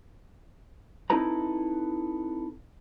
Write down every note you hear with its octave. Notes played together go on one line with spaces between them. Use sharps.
C4 D#4 E4 A4 B4 A#5